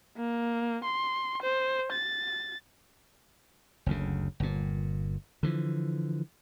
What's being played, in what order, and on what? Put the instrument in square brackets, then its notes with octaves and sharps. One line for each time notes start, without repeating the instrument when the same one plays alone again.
[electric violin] A#3
C6
C5
A6
[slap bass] F#1 D2 A#2 C#3
G1 A#2
D3 E3 F3